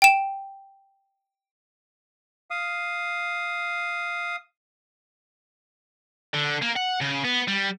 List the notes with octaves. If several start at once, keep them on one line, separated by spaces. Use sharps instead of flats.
G5 E7
F5 D#6
D3
A#3
F#5
C#3
B3
G3